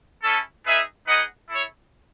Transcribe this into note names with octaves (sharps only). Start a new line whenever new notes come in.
C#4 E4 A4
D#4 G#4 B4 E5
D#4 G#4 B4 D#5 F#5
E4 A4 C#5